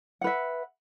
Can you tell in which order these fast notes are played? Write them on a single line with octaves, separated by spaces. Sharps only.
F#5 B4 E5